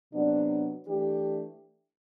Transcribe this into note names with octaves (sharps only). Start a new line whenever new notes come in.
C3 F#3 B3 D4
E3 A3 D4 G4